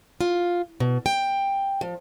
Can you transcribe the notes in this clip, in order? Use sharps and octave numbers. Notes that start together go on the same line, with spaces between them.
F4
B2
G5
F3